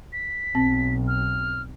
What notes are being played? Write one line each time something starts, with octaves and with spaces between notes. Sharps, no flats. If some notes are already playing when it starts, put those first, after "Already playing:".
B6
B1 C4
F6